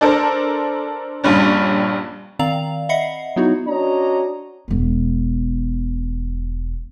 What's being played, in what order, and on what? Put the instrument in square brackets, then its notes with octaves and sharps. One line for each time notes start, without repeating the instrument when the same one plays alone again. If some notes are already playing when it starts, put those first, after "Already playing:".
[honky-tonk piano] D4 A4 A#4 C5
A#1 G2 G3 C#4
[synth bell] D#3 C4 D5 F5 A#5 F7
D#5 E5 F#5 B5 C7 C#7
F#3 B3 D#4 E4 F#4
[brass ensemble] C#4 D4 F#4 C#5 D#5 A#5
[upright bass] E1 B3